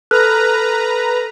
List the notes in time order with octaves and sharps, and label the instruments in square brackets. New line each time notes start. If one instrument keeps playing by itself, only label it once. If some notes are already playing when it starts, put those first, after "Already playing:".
[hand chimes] A4 F6 F#6 [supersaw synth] B4 A#5